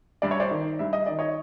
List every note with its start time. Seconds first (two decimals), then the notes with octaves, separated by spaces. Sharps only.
0.22 G2 D5
0.31 C#5
0.40 C5 D5
0.51 D#3
0.79 G2 E5
0.93 D#5
1.06 D#3 D5
1.19 C#5 D#5